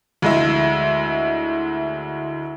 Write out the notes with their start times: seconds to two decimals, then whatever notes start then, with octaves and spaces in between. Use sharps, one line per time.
0.22 D2 G#3 E4